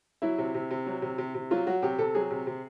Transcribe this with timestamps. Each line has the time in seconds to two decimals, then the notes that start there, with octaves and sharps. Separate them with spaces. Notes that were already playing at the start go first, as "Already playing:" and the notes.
0.22 F#3 E4
0.38 C3
0.54 C3
0.71 C3
0.86 F#3
1.02 C3
1.18 C3
1.34 C3
1.51 F#3 F4
1.67 F#3 F#4
1.82 C3 G4
1.98 C3 A4
2.15 F#3 G#4
2.30 C3
2.47 C3